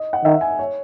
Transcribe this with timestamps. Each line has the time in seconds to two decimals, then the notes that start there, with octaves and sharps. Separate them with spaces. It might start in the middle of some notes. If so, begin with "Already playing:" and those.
Already playing: D#5
0.13 F#5
0.25 D#3 E5
0.41 G#5
0.59 C#5